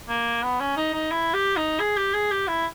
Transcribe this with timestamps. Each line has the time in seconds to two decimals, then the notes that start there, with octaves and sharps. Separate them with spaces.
0.09 A#3
0.44 B3
0.61 C#4
0.77 D#4
0.94 D#4
1.12 E4
1.34 G4
1.57 D#4
1.80 G#4
1.97 G4
2.14 G#4
2.31 G4
2.48 E4